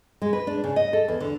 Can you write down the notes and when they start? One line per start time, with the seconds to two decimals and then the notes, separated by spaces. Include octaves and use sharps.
0.22 G#3
0.33 B4
0.47 D4
0.64 C#3
0.76 D#5
0.93 A4
1.08 E2
1.20 D3